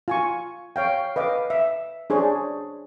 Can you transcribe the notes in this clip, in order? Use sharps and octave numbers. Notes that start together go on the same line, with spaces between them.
F4 G#5 C#6
C#5 F5 G5
B4 D#5 F5 D6
E5
D4 G#4 C5 C#5